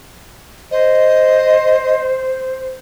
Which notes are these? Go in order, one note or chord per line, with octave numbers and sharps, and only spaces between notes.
C5 D#5